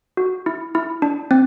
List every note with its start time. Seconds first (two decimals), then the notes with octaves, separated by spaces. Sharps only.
0.17 F#4
0.46 E4
0.75 E4
1.02 D4
1.31 C4